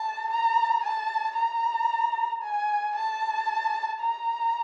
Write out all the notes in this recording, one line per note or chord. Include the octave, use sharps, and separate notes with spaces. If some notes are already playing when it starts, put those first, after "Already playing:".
Already playing: A5
A#5
A5
A#5
G#5
A5
A#5